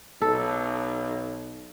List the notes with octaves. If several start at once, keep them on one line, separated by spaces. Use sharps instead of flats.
B1 A4